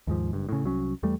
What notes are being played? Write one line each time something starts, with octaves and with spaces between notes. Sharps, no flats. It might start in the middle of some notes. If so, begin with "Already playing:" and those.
D#2 G#2 F3
F#1 G2
A2 C#3
C2 F#3 C#4
E2 G3 A3